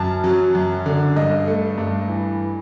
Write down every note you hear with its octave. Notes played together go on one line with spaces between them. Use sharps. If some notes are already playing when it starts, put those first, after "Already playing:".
Already playing: F#2 A5
F#3
F#2
D3
G2 D#5
A3
G2
E3